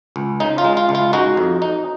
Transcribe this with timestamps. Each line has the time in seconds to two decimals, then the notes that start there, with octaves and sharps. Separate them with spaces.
0.16 C#2
0.40 C#3 D#4
0.58 F4
0.64 G#3
0.77 F4
0.89 C#2
0.95 F4
1.13 G#3 D#4 F#4
1.37 F2
1.62 D#4